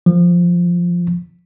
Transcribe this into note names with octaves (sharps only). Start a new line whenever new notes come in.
F3